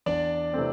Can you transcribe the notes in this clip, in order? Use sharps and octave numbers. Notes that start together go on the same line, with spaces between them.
E2 D4 D5
C3 E3 A3 C4